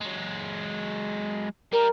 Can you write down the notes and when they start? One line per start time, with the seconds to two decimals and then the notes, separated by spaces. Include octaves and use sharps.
0.01 F#3 G#3
1.73 G3 A#4